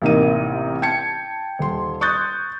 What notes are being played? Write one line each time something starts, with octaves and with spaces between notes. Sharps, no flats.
A1 C3 A#3 D#4 A#4 D#7
G5 A5 G#6 C#7
D#1 C6
C6 C#6 D#6 F#6 G6 A6